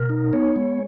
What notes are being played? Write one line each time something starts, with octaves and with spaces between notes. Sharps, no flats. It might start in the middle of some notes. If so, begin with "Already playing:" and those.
Already playing: B2 A#4
D#4
B3 C#5
G#3